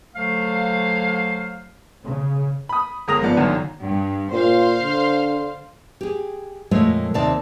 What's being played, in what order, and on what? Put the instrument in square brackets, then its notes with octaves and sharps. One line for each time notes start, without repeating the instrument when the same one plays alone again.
[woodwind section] D3 F#3 A3 C5 F5
[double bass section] C#3
[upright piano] B5 D#6
G1 G#3 A#4 D#6 A#6 F7
G#2 F3 B3 D5
G1 F#2 D3 D#3 F#3
[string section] G2
[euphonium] A#2 [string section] C5 F5
[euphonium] D3
[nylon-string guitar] G4 G#4
F2 A#2 G#3 A3 C#5
D#2 C3 C4 D#4 D5 A5